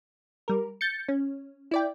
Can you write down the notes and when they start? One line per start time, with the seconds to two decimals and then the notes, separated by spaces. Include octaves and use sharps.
0.48 G3 A#4
0.81 G6 A6 C#7
1.09 C#4
1.71 E4 D5 G5